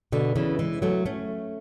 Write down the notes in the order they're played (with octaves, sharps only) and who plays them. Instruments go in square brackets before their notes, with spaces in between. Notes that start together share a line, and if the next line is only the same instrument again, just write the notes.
[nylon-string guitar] B2 D3
C#3 E3
E3 G#3
F#3 A3
A3 C#4